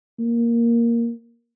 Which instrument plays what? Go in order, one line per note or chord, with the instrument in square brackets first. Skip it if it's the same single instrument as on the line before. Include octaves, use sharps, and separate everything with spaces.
[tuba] A#3